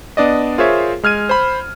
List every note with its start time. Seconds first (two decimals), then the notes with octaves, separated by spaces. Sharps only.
0.17 B3 D4 D5 D#5
0.58 F4 G#4 A#4 C5 C#5 E5
1.03 G#3 F6 G#6 D#7
1.29 C5 B5